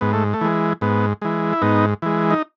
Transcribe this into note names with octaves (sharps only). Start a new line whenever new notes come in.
G#2 B3
A3
A3
E3 G#3
G#2 B3
E3 G#3
E4
G#2 B3 D#4
E3 G#3
D#4